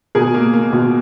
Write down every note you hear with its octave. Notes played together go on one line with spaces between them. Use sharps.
B2 G#4 A#4
A#3
A#3
B2